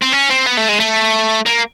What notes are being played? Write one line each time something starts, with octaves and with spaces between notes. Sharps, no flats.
C4
C#4
C4
B3
A3
G#3
A3
A#3